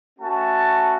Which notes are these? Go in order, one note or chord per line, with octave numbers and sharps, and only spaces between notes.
A3 C#4 F#4 A5